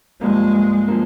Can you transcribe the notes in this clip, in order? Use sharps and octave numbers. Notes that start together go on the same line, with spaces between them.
G2 F3 G#3 A#3
F3 A#3